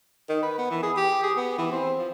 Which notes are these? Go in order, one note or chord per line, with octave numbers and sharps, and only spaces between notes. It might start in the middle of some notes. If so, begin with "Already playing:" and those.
D#3
B4
B3
E3
G#4
G4
G#4
B3
E3
C4
F3